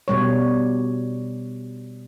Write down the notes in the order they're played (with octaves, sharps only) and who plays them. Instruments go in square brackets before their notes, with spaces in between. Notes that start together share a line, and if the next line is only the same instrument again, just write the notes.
[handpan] B2 G3 C#5